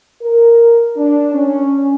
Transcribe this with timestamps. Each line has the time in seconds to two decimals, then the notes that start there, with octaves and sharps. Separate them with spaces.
0.22 A#4
0.97 D4
1.33 C#4